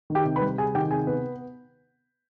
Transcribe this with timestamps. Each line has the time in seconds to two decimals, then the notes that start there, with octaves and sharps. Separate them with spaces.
0.10 D#3
0.15 G4 G5
0.25 C3
0.36 B4 B5
0.41 G3
0.58 C3 G#4 G#5
0.75 D#3 G4 G5
0.90 C3 G#4 G#5
1.07 B3 B4